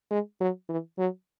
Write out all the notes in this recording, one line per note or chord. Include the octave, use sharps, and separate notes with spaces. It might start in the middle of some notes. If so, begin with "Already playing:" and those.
G#3
F#3
E3
F#3